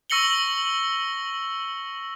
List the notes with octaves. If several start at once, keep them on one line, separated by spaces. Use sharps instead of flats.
C#6 E6 A#6 C#7 F#7 G7